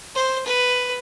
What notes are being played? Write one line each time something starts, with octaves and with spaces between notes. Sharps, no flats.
C5
B4